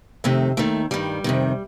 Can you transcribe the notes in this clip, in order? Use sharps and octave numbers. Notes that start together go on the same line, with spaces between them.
F2 C3 D#3 A3
D#2 D#3 A3
G2 D#3 G3
F2 C3 D#3